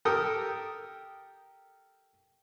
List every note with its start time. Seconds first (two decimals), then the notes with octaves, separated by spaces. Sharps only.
0.05 G4 A4 A#4 G5 D#6